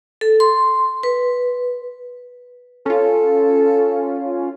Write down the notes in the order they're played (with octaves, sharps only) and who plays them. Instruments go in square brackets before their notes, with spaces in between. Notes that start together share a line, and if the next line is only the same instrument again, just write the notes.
[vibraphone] A4
C6
B4
[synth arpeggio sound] C#4 F4 [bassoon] A4